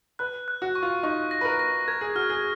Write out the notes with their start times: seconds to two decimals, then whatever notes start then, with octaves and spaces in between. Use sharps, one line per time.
0.19 B4 F#6
0.48 F#6
0.62 F#4
0.75 C#6
0.82 F4
1.03 D#4 C#6
1.31 A#6
1.41 B4
1.45 A#4
1.59 A#6
1.88 A#4 G#6
2.01 G#4
2.15 F#4 F6
2.30 G#4